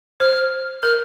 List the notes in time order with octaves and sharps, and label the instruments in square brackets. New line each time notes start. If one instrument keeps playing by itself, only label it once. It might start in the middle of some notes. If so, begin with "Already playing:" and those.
[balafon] C5 [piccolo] F6
[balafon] A#4 [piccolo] F6